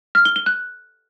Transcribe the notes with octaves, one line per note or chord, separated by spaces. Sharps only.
F6
G7
G7
F#6